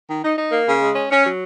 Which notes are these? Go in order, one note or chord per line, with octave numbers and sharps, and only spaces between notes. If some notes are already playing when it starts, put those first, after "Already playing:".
D#3
D#4
D#4
A#3
C#3
G#3
C#4
C#4
F#3